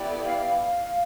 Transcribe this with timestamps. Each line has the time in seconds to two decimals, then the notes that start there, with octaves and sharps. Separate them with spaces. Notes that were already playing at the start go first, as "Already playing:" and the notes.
Already playing: B3 E4 G4 D5
0.08 A4
0.24 F5
0.40 F5